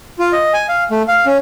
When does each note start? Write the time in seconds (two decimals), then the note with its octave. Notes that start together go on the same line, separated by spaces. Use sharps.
0.19 F4
0.33 D#5
0.54 G#5
0.69 F5
0.91 A3
1.08 F5
1.26 C#4